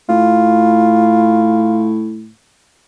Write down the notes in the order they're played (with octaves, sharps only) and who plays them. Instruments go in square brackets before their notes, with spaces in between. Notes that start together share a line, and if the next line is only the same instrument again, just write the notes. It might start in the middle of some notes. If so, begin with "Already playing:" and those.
[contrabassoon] A2 [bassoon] F4